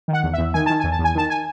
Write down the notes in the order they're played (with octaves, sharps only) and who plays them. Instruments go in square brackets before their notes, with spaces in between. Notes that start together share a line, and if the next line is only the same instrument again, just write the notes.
[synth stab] D#3
F#5
E2
E2 E5
D#3 G#5
D#3 A5
E2 G#5
A5
E2
G#5
D#3 A5
G#5